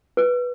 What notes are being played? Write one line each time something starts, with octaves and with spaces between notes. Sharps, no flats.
B4